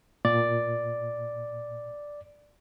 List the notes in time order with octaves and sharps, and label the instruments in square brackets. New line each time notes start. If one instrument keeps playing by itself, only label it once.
[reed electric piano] A#2 [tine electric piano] D5